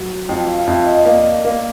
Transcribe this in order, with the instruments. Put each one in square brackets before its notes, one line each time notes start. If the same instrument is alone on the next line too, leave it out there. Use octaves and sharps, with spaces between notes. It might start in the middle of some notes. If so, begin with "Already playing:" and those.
Already playing: [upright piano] F#3
[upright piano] F2 [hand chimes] G5
[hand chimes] F5
F5
[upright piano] F2 [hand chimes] E5
[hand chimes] D#5
[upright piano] A#3 [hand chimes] D5
[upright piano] A#3